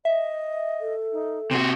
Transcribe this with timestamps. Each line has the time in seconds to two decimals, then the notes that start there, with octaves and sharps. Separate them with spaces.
0.05 D#5 E5
0.81 A4
1.12 D#4
1.51 C3 F#4 C6